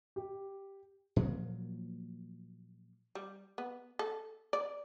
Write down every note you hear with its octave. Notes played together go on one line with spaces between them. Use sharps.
G4
A#2 F3 F#3 A#3
G3
B3
A4
D5